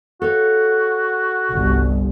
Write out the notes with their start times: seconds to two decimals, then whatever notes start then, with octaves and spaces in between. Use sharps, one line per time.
0.22 F#4 A4 C#5 F5
1.52 G1 C2